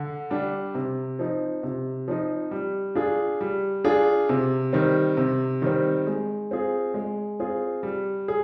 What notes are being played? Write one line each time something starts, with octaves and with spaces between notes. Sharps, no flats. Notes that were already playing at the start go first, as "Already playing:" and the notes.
Already playing: D3
G3 D4 G4
C3
F3 C4 D#4
C3
F3 C4 D#4
G3
D4 F4 G#4
G3
D4 F4 G#4
C3
D#3 G3 C4
C3
D#3 G3 C4
G#3
C4 F4 G#4
G#3
C4 F4 G#4
G3
G#4